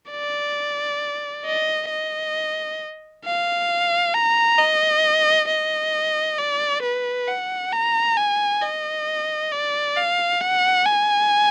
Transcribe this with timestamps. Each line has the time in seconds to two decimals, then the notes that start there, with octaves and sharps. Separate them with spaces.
0.11 D5
1.45 D#5
1.90 D#5
3.25 F5
4.14 A#5
4.58 D#5
5.48 D#5
6.38 D5
6.83 B4
7.28 F#5
7.73 A#5
8.17 G#5
8.61 D#5
9.52 D5
9.97 F5
10.41 F#5
10.85 G#5